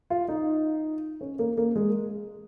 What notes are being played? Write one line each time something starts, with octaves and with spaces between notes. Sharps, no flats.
F4
D#4
C#4
A#3
A#3
G#3